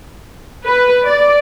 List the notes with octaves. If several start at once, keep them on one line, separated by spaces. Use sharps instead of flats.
B4
D5